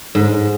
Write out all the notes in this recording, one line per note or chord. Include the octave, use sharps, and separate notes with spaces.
G#2